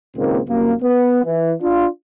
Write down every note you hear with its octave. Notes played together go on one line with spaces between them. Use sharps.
C#2 A#2 D#3 A#3 C4
C2 F#2 A#3
B3
E3
D4 F4